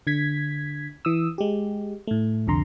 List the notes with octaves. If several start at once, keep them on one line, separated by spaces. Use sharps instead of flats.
D3 G#6 B6
E3 D#6 E6
G#3 G4
A2 A3
C2 F2 D3 A#5 C6